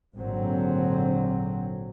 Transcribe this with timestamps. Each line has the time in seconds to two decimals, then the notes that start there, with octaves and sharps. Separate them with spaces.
0.15 G#1 A#2 D3 F#3 C4